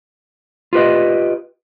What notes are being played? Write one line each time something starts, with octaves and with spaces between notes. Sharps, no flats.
F4 G4 B4 D#5